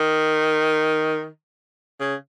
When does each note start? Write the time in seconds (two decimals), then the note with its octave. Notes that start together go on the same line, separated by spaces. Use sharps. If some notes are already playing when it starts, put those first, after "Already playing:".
Already playing: D#3
2.00 C#3